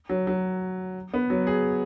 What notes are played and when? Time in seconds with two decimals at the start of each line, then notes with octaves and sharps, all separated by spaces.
0.09 F#3
0.27 F#3
1.14 B3
1.30 F#3
1.47 G#4